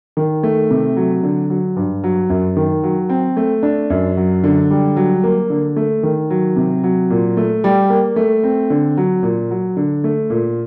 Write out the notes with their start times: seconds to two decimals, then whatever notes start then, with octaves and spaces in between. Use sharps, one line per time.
0.17 D#3
0.43 A3
0.70 C3
0.96 F#3
1.23 D3
1.50 F#3
1.76 G2
2.04 F#3
2.30 F#2
2.57 D#3
2.83 F#3
3.09 C4
3.37 A3
3.63 D4
3.90 F#2
4.17 F#3
4.44 D3
4.71 G3
4.96 F#3
5.24 A#3
5.50 D3
5.76 A3
6.03 D#3
6.30 F#3
6.56 C3
6.83 F#3
7.10 A#2
7.37 A3
7.64 G3
7.90 A#3
8.16 A3
8.43 C4
8.70 D3
8.97 F#3
9.23 A#2
9.51 F#3
9.77 D3
10.04 A3
10.30 A#2